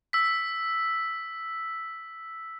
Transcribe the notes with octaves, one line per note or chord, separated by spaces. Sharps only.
E6 B6